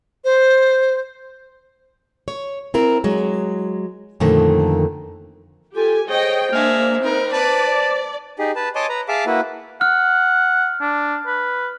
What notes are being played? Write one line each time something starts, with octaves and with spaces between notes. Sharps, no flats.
C5
C#5
C4 E4 A#4
F#3 G#3
F2 A#2 D3 D#3 A3
F4 G4 A4 G#5
G#4 C5 C#5 D#5 G5
G#3 A#3 D4 E5 F6
C4 D#4 A#4 B4
B4 D5 A5
D#4 G4 G#4
B4 A5
C#5 D#5 G#5 A5 C6 D6
B4 A#5
G#4 E5 F5 A5 D6
A#3 E4 F#4 B4
F#5 F6
D4
B4